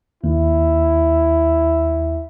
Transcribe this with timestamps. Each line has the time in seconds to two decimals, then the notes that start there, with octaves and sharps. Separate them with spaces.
0.24 D#2 E4